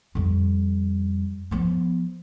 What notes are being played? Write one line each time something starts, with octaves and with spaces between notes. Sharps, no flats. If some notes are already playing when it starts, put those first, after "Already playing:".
F2 G3
F3 B3